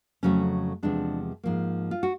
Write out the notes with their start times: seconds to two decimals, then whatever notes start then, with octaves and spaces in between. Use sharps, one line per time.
0.23 F2 C#3 F#3 A3 C#4
0.83 E2 C3 F3 G#3 D4
1.43 G#2 F3 A#3
1.91 F4
2.03 F#4